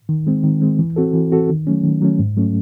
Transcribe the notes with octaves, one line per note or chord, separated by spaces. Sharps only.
D#3
G#3 C4
D#3
G#3 C4
E3
C4 F#4 A4
E3
C4 F#4 A4
D#3
F#3 A3 C#4
D#3
F#3 A3 C#4
G#2
F#3 A3 C#4